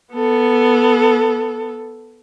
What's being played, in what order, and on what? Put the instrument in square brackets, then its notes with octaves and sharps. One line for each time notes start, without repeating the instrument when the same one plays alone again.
[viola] B3 A4